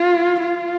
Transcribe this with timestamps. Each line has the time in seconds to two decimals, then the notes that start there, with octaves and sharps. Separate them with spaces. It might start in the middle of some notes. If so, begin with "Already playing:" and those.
Already playing: F4
0.40 F4